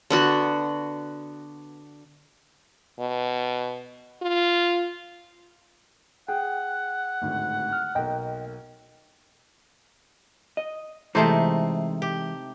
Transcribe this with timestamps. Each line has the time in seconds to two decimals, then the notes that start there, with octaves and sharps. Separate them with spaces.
0.10 D3 B3 F#4
3.00 B2
4.22 F4
6.28 G#4 F#5 G5
7.22 D1 G#1 D2
7.73 F6
7.95 B1 A#3 D#5 G5
10.57 D#5
11.15 C3 E3 G#3 A3 D#4 C5
12.02 G4